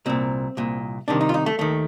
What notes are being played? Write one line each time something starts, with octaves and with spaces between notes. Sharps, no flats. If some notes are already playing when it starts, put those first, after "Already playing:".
C2 A#2 C4
C2 A#2
C2 C3 D#3 D4
D#4
F4
D#4
A3
D#2 D#3 A3